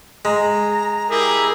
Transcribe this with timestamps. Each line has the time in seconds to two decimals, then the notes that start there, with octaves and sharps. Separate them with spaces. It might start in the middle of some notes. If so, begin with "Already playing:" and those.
0.25 G#3 A#5
1.10 E4 G4 G#4 A#4